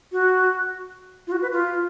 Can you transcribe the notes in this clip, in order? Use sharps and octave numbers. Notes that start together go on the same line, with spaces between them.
F#4
F4
F#4
B4
F4